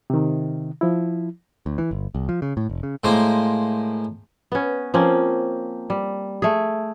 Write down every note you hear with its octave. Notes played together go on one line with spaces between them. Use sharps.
C3 D#3
F3 E4
D2
E3
G1
C2
F3
C#3
A2
F1
C#3
A2 G#3 A#3 C5
B3 C#4
F3 A#3 C4 C#4
G3
A3 G#4